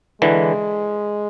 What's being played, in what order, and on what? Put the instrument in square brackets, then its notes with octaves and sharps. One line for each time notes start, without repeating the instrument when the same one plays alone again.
[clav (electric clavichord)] D3 E3 [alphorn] G#3